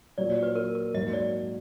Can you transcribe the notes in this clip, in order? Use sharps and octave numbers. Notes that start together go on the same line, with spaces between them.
A#2 F#3 A#3 D5
D5
B4
A#4
A#4
G#2 F#3 A#3 D#5
D5